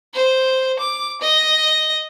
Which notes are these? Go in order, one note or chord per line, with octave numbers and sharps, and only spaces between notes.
C5
D6
D#5